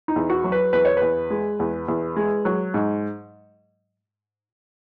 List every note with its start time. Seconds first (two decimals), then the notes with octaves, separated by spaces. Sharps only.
0.08 D#4
0.16 E2
0.30 F#4
0.44 F#3
0.52 B4
0.73 E2 B4
0.85 C#5
0.97 E2 B4
1.30 G#3
1.60 E2
1.88 E2
2.16 G#3
2.45 F#3
2.74 G#2